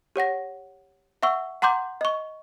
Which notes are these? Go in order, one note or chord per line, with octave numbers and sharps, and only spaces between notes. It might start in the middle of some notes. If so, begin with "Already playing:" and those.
G4 C#5 F#5 A#6
E5 F#5 C#6 E6
F#5 A#5 C6 D6 G6
D#5 C#6